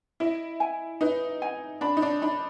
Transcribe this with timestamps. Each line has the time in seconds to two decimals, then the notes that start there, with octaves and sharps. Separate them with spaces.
0.20 E4 D#5
0.60 G#5
1.01 D#4 B4
1.42 G#5
1.81 D4 B5
1.97 D#4
2.02 D4
2.22 D#4 B5